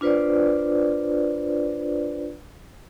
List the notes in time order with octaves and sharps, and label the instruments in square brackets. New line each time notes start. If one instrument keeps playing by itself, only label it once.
[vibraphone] D4 F4 B4 C5 D5